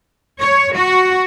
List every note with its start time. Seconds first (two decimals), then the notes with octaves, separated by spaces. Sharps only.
0.40 C#5
0.74 F#4